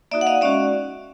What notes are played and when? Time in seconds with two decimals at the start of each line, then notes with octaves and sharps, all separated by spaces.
0.11 A#3 D#4 F#4 D5 E5
0.21 F#5
0.27 D#5 F5
0.41 G#3 C#4 F#4 D5 E5